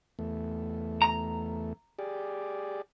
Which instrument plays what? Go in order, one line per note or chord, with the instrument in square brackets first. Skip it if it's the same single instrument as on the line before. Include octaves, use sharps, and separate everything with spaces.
[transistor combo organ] E2 A3
[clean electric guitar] A#5
[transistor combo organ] G4 G#4 D5